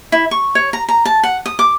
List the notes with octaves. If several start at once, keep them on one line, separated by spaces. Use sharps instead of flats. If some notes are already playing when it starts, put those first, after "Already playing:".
E4
C#6
C#5
A#5
A#5
A5
F#5
D#6
D6